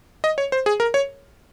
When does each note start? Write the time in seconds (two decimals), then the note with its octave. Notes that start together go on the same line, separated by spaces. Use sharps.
0.24 D#5
0.38 C#5
0.52 C5
0.66 G#4
0.80 A#4
0.94 C#5